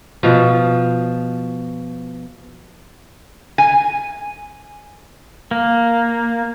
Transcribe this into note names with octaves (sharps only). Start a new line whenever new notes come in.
B2 F3
G#5
A#3